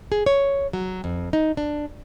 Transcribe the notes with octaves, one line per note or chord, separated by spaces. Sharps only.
G#4
C#5
F#3
F2
D#4
D4